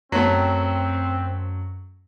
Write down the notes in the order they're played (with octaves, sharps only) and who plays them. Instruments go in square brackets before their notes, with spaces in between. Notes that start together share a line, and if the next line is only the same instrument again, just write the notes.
[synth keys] F#2 [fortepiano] F#3 A3 [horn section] C4